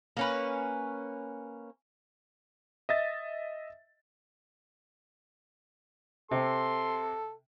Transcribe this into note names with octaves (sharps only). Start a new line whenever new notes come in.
A#3 C#4 B4
D#5 E5 A6
C3 A4 C6